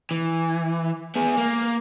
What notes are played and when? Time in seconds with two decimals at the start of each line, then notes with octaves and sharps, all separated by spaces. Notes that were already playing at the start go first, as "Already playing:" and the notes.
0.11 E3
1.16 B3 G#4
1.37 A#3